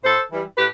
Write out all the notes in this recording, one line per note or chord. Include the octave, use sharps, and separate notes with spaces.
A2 A4 C5
E3 G3
A2 G4 B4